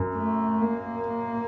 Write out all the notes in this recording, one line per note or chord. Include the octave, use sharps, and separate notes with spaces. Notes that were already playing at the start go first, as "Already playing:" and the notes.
Already playing: F#2
A3
A#3